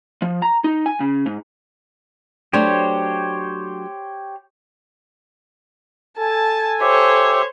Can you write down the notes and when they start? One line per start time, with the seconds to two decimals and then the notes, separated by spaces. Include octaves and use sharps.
0.22 F3
0.42 A#5
0.64 D#4
0.86 G#5
1.00 C#3
1.26 G#2
2.53 F#3 A3 D4 G4 C5 C#5
6.18 A4 G#5 A5
6.81 G4 C5 C#5 E5